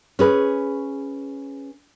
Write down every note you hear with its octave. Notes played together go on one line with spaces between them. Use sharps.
C#4 G#4 B4